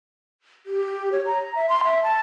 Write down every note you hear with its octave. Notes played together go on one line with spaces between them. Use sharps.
G4
C#5
A#5
E5
C6
E5
A5